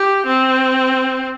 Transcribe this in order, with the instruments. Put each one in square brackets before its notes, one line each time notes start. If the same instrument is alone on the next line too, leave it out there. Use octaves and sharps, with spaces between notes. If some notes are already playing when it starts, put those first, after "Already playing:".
Already playing: [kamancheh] G4
C4